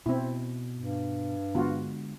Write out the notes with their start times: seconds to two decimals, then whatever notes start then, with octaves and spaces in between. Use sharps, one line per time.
0.06 B2 C4 E4
0.76 G2
1.55 D3 G#3 B3 F4 F#4